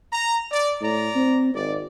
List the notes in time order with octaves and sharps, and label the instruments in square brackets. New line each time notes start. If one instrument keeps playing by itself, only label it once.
[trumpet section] A#5
D5
[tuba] A2 [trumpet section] D5 A#5
[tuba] C4
[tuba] G#1 [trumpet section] D5